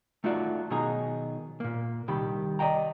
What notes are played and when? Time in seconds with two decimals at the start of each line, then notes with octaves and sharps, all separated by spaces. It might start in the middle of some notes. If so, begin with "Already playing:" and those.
0.24 A3 D#4 F4 F#4 D5
0.71 B2 D#3 F#3 D#4 G#4 A#5
1.60 A#2 A#3
2.08 C2 D#3 G4 B5
2.59 D5 D#5 G5 A#5